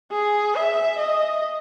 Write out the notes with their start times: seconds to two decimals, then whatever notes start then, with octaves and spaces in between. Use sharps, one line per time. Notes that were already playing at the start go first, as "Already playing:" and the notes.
0.11 G#4
0.55 E5
0.99 D#5